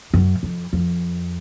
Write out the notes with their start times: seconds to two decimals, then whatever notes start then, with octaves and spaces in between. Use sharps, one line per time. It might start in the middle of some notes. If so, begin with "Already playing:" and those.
0.14 F#2
0.43 F2
0.73 F2